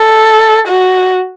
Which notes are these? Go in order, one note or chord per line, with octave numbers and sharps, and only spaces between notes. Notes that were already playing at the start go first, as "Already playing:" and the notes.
Already playing: A4
F#4